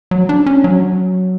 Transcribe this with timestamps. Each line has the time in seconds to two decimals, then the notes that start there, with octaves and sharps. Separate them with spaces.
0.11 F#3
0.29 D4
0.46 C#4
0.64 F#3